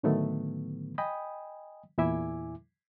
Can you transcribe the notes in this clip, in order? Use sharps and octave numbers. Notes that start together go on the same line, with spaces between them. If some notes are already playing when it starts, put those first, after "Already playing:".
A2 D3 D#3 F#3 A3 B3
D#5 G5 G#5 B5 D#6
E2 A#2 E4 E5 G#5 D6